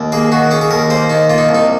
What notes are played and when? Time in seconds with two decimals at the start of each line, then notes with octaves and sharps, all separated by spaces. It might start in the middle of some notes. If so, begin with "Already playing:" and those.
Already playing: D#2
0.12 A#3 G#4
0.32 D#3 F#4
0.51 C#4 G#4
0.61 G#4
0.71 D#2 A#4
0.90 A#3 C5
1.10 D#3 D#4
1.30 A#3 F4
1.38 D#4
1.49 C2
1.55 D#4